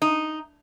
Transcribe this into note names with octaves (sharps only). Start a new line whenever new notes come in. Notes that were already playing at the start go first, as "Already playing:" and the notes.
D#4